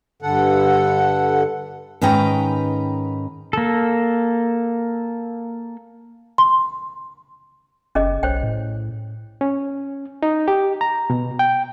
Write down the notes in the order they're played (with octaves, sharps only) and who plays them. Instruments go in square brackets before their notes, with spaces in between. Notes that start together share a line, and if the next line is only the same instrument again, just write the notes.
[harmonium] G2 D3 A4 F#5
[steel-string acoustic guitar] G#2 D#3 C#4 B4 G5 A#5
[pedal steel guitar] A#3 A4
[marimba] C6
[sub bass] F#1 [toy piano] C#4 G#4 D#5
[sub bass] B1 [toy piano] C5 C#5 G5
[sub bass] A2
[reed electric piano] C#4
D#4
G4
A#5
B2
G5